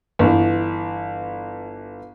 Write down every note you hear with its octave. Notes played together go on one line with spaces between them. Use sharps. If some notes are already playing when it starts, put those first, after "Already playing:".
G1 E3